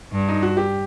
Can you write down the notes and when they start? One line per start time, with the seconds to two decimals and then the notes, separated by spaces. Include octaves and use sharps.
0.13 G2
0.29 D#4
0.42 F#4
0.57 G4